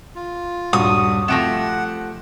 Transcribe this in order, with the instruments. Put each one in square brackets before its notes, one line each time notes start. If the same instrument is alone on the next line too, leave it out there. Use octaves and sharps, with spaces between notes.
[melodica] F4
[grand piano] D#1 G2 [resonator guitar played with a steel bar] F#4 [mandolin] D#6
[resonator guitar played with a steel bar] C3 F3 A3 [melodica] F#5 [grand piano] A#6 D7 E7